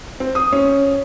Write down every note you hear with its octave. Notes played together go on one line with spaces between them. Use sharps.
C4
D#6
C#4